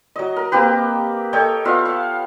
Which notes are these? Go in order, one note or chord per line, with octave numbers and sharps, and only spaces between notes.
F#3 D#5
A#4
A#3 C4 G4 B4
A4 C#5 D#5 G5
B3 F4 E5 F5
F5